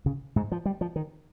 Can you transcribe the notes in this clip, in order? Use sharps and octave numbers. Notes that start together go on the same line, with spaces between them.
C#3
G#2
F3
G3
F3
D#3